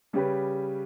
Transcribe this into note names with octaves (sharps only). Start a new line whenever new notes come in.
C#3 G3 C#4 G4 B4